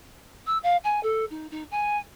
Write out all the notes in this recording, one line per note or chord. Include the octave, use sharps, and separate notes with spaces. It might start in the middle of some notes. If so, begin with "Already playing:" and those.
E6
F5
G#5
A4
D#4
D#4
G#5